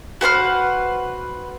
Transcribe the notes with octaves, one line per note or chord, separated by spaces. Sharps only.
F#4 B4 C5 F6